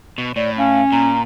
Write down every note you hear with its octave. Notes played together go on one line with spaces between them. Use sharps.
B2
A2 D5
C#4 F5
A#2 A#5